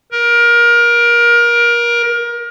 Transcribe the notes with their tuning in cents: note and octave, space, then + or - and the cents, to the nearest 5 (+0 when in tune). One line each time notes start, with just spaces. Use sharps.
A#4 +25